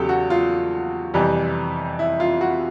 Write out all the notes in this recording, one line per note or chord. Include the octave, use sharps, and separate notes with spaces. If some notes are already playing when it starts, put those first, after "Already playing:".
Already playing: E2 C#3 F#3 G4 A4
F#4
F4
F2 C3 E3 G3
E4
F4
F#4